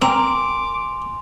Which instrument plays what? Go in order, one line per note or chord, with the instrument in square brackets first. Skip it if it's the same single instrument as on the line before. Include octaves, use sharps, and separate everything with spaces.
[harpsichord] C4 [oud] A#4 [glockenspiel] G#5 C6 F7 [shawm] D6